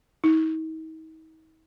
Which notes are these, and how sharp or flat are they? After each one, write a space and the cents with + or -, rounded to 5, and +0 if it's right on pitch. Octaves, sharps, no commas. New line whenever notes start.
D#4 +40